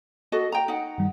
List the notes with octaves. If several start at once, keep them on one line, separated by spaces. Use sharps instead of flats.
F#4 A4 D#5
G5 A#5
D#4 F#5
G2 D#3 G3